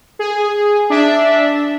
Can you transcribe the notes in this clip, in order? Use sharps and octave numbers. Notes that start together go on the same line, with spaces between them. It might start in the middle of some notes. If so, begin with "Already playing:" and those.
G#4
D4 E5